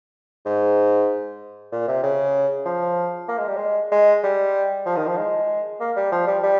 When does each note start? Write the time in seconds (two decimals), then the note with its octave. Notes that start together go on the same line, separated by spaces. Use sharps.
0.46 G#2
1.72 A#2
1.88 C3
2.03 C#3
2.66 F3
3.28 A#3
3.38 G#3
3.47 G3
3.56 G#3
3.92 G#3
4.23 G3
4.86 F3
4.97 D#3
5.07 F3
5.17 G#3
5.80 A#3
5.96 G3
6.12 F3
6.27 G3
6.43 G3